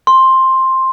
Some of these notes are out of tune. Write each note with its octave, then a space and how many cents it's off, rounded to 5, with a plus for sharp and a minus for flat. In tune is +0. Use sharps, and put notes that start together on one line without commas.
C6 +10